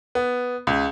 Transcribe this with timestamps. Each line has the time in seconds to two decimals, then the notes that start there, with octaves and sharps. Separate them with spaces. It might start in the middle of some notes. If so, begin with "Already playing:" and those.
0.15 B3
0.67 C#2